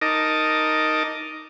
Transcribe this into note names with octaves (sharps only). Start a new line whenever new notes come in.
D#4 A#4 D#5 A5 D6